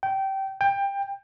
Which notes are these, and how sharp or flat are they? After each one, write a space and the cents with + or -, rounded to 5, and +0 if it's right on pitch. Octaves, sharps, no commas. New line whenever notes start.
G5 -20
G5 +20